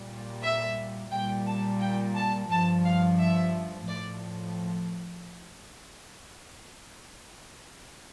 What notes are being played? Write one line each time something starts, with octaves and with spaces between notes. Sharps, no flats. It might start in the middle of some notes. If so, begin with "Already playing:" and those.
Already playing: A#2 G3
E5
A#2 G3 G5
A5
G5
A5
G2 F3 A5
F5
E5
A2 F3 D5